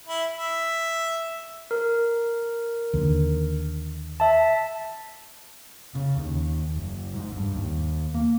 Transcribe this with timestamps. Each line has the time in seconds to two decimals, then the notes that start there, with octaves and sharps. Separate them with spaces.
0.07 E4
0.36 E5
1.71 A#4
2.93 D#2 D3
4.20 E5 A5
5.95 C#3
6.16 D#2
6.75 F#1
7.14 G#2
7.36 G2
7.55 D#2
8.14 A#3